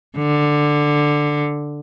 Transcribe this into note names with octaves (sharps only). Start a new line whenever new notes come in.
D3